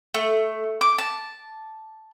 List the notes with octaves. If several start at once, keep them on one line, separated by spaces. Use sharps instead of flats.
A3
D6
A5